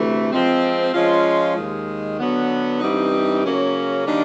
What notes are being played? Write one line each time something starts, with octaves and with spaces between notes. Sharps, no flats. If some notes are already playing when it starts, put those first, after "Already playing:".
Already playing: D2 C3 E3 A3
F3 G#3 C4
F3 G#3 C#4 F4
D#2 D#3 G#3
D3 F#3 B3
G2 E3 G3 C4 D#4
C#3 F#3 A#3 C#4
D#3 G3 A#3 D4